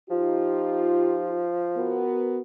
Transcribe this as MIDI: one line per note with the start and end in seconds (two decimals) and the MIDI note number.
0.10 2.16 53
0.10 1.46 63
0.10 1.46 65
0.10 1.46 67
1.76 2.40 59
1.76 2.40 66
1.76 2.40 70